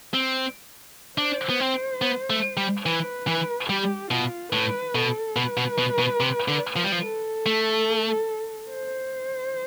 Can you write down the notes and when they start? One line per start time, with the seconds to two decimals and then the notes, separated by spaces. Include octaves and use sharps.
0.14 C4
1.18 D4 C5
1.50 B3
1.60 C4
2.02 B3
2.30 A3
2.57 G3
2.85 E3 B4
3.27 E3
3.69 G3 G4
4.11 B2 F4
4.52 A2 B4
4.95 B2 A4
5.36 B2 B4
5.57 B2
5.78 B2
5.99 B2
6.20 C3
6.48 D3
6.76 F3
6.84 G3
6.92 F3
7.03 A4
7.46 A3
8.71 C5